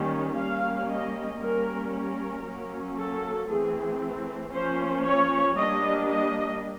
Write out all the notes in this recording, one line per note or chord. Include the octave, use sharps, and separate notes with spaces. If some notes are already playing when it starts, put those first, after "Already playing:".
Already playing: D#3 G3 A#3 C#4
G3 A#3 C#4 F5
D#5
G3 A#3 C#4 A#4
A#4
F#3 A#3 C#4
A4
E3 A3 C4 G#4
F3 A#3 C#4 C5
C#5
G3 A#3 D4 D#5
D#5